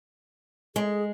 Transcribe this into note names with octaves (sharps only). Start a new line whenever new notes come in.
G#3 G#4